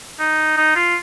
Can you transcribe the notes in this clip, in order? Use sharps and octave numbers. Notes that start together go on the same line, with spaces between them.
D#4
D#4
F4